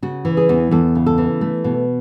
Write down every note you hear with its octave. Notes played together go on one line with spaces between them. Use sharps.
C#3 F#4
E3
G#4
E2
E2 A4
C#3
A4
E3
A3
B2